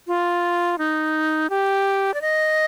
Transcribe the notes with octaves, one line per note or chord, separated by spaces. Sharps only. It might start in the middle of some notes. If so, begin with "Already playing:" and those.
F4
D#4
G4
D5
D#5